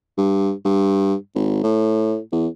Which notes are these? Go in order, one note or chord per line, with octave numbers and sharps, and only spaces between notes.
G2
G2
G#1
A2
E2